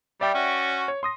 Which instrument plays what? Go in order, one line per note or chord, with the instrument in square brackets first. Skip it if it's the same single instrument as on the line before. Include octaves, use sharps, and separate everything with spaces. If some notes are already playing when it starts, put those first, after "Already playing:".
[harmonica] G3 [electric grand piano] D5 E5 G5
[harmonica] C#4 F#4
[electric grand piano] C#5
C6 D#6 A#6